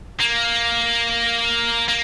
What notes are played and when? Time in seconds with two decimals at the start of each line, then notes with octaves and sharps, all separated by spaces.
0.20 A#3
1.88 A#3